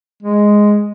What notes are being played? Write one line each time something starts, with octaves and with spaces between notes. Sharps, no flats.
G#3